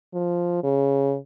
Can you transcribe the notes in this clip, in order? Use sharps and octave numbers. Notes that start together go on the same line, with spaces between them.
F3
C#3